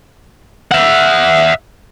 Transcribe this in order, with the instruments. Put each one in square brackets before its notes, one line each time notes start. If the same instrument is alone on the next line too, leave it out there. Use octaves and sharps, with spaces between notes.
[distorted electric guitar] E5 F#5